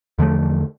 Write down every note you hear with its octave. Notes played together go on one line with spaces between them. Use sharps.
E2 D3 F3 A3